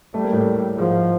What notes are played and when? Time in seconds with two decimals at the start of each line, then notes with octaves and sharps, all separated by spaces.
0.14 G3 A3
0.24 A#3
0.33 A2 A3
0.78 G#2 F3 G#3